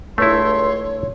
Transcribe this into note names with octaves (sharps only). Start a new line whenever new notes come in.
C#2 G2 A3 E4 C#5 C6